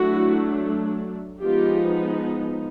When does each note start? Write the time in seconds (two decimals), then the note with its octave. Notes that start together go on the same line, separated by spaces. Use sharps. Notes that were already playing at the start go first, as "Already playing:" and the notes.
Already playing: F#3 A3 D4 E4 F#4
1.42 F3 G#3 B3 D#4 F4 G4